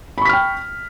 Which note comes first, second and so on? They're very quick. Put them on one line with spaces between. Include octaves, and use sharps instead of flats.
B5 C#6 B6 F6 G5